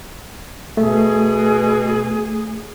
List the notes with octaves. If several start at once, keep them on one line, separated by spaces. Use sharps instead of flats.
B2 A3 G#4